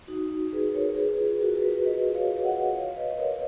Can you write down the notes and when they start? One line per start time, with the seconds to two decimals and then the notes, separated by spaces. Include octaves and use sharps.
0.08 D#4 F#4
0.52 G#4 B4
0.74 A#4 C#5
0.96 G#4 B4
1.19 F4 G#4
1.41 F#4 A#4
1.63 G#4 B4
1.85 B4 D#5
2.14 C#5 F5
2.44 D#5 F#5
2.74 C#5 F5
2.96 B4 D#5
3.10 D#5
3.18 A#4 C#5